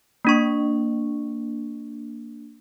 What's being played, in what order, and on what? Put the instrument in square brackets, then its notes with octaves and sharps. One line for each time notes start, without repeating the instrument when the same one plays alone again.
[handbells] A#3 D4 C#6